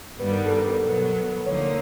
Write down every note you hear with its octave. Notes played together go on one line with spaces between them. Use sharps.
G2 D#3 G3 B3 B4
A#4
A4
A#4
B2 F#3 B3
D2 D3 F3 A#3 D#4 C#5